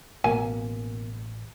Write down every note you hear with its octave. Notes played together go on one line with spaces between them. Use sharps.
A1 B2 A#3 G#5